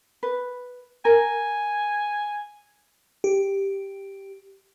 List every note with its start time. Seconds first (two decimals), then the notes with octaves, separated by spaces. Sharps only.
0.23 B4
1.05 A#4 G#5
3.24 G4